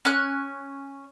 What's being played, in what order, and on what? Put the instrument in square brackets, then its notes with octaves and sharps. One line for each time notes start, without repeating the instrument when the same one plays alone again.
[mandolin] C#4 G#5 F#6